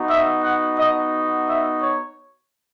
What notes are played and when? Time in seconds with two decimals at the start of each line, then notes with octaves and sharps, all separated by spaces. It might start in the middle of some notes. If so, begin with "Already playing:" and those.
Already playing: B3 D#4 F#4
0.10 E5
0.44 F#5
0.79 D#5
1.48 E5
1.82 C#5